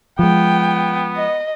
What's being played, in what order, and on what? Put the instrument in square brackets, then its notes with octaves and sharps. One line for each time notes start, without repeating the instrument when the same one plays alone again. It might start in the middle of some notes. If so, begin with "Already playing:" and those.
[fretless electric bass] F3 G#3 [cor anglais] B3 [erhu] G5
[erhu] D#5